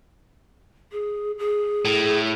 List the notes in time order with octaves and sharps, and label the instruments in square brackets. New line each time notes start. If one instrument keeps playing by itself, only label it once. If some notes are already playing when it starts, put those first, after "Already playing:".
[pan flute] G#4
G#4
[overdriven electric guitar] A2